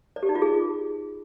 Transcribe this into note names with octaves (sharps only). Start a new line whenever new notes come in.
D5
G4
D#4
F4
G#4